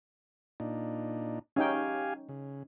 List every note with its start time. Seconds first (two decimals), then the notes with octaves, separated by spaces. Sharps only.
0.60 A#2 D4 D#4
1.56 C#4 D#4 G4 F5 G5 G#5
2.29 C#3